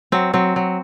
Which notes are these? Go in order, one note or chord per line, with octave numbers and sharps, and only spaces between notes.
F#3 C4
F#3 C4
F#3